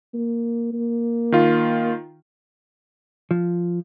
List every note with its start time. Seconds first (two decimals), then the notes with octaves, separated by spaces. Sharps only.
0.14 A#3
0.73 A#3
1.32 D#3 F4
3.31 F3